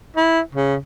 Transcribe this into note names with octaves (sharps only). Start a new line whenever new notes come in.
E4
C#3